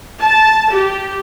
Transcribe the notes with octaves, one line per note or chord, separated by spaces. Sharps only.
A5
G4